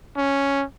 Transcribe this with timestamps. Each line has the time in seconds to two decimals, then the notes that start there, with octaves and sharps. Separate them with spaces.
0.17 C#4